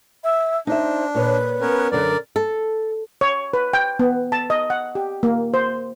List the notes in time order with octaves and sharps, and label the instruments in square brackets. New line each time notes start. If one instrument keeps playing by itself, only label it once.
[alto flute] E5
[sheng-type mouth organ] D4 [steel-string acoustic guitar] D#4 E5 [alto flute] C5
[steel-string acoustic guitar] A#2 C#5 [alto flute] B4
[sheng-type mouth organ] B3 C#4 A#4
[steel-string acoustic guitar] F#2 D3 [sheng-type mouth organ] A#4 D5
[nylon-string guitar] A4
[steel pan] C#5
B4
G5
B3
A5
D#5
F#5
G4
A#3
C5